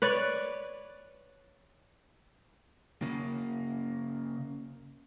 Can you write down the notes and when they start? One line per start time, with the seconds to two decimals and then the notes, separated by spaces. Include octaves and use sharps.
0.02 B4 C#5 D5
3.02 C#3 A#3